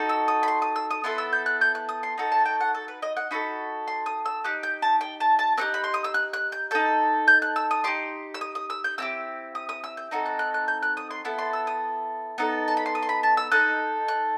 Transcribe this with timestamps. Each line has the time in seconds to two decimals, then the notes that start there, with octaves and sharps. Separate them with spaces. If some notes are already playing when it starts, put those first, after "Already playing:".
Already playing: D#4 F#4 A4
0.09 E6
0.28 D#6
0.43 B5
0.48 C6
0.62 D#6
0.76 E6
0.91 D#6
1.04 B3 E4 A4 C6
1.18 E6
1.33 G6
1.46 F#6
1.61 G6
1.75 F#6
1.89 D#6
2.03 C6
2.18 D#4 F#4 A4
2.32 A5
2.46 G5
2.61 F#5
2.75 A4
2.88 B4
3.02 D#5
3.17 F#5
3.31 D#4 F#4 A4 B5
3.88 C6
4.06 D#6
4.26 E6
4.44 D#4 G4 F#6
4.63 G6
4.82 A5
5.01 G5
5.20 A5
5.39 A5
5.57 C4 D#4 G4 F#6
5.74 B5
5.84 C6
5.94 D#6
6.04 E6
6.14 F#6
6.33 F#6
6.52 G6
6.71 D#4 A4 G6
7.28 G6
7.42 F#6
7.56 E6
7.71 D#6
7.84 D#4 G4 C6
8.34 E6
8.41 D#6
8.55 D#6
8.70 E6
8.84 G6
8.98 C4 E4 G4 E6
9.55 D#6
9.69 D#6
9.84 E6
9.97 G6
10.11 C4 D#4 F#4 A4
10.26 F#6
10.39 F#6
10.54 F#6
10.68 G6
10.83 F#6
10.97 D#6
11.11 C6
11.25 B3 E4 A4
11.39 C6
11.53 E6
11.67 D#6
12.38 B3 D#4 A4
12.68 A5
12.77 B5
12.86 C6
12.95 D#6
13.03 C6
13.09 B5
13.23 A5
13.37 E6
13.51 D#4 A4 F#6
14.08 F#6